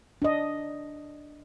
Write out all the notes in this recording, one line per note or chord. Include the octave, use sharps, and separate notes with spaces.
D4 D#5